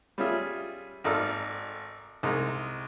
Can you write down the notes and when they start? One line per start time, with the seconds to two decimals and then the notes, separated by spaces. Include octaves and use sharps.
0.18 G3 C#4 F4 G#4 E5
1.04 G#1 D#4 A4 D5 E6 F6
2.23 C2 G#3 D#4